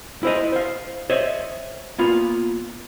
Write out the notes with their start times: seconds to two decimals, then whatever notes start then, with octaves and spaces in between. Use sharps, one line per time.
0.23 E4 C5 D#5
0.52 C5 F5
1.10 C5 C#5 D#5 E5
1.99 A#3 B3 F4